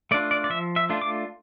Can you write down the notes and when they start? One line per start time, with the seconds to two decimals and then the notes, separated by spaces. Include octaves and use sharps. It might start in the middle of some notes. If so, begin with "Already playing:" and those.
0.11 A3 D4 F4 D5
0.31 D5
0.44 D5
0.50 F3 E5
0.76 E5
0.90 A3 D4 F4
1.02 D6